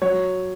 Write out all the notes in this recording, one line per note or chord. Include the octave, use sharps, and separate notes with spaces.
F#3 C#5